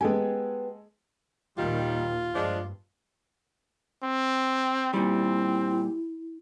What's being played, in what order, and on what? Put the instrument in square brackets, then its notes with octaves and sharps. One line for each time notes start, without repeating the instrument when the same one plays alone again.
[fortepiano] G#3 A4 G#5 [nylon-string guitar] B3 G4
[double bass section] D#2 A#2 [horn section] D#3 G3 [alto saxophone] F4
[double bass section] G2 [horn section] F3 G#3 D4
[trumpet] C4
[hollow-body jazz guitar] A#2 G3 [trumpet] C4 [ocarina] E4